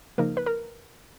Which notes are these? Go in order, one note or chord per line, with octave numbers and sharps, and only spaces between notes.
C#3 F3 A#3 D#4 A#4
B4
A#4